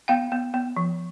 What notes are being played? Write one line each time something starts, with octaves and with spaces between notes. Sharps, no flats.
B3 F5 G5
B3
B3
F3